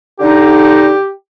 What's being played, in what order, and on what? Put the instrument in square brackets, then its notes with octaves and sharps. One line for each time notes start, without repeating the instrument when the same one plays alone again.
[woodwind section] D3 D#4 [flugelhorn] G4